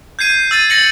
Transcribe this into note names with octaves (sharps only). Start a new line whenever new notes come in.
G6 G#6 C7 D#7
E6 A6 D#7
A6 A#6 C#7 F#7